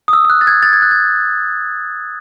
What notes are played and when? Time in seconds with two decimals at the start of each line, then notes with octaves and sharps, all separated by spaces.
0.08 D#6
0.13 E6
0.25 E6
0.30 F#6
0.41 A6
0.47 G#6
0.63 A6
0.73 G#6
0.82 F#6
0.91 G#6